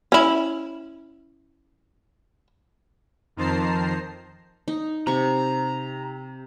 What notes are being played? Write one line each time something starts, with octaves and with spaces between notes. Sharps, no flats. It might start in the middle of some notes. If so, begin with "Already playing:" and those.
C#4 E4
F2 D#3 C5 A5 A#5 C7
D#4
C3 A#5 C#6